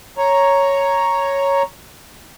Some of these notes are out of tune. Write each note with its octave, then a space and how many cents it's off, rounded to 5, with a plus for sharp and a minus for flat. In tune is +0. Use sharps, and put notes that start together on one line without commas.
C#5 +0 A#5 +0